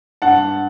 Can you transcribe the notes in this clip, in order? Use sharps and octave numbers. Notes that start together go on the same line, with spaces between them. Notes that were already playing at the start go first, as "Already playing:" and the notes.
G2 F#5 A5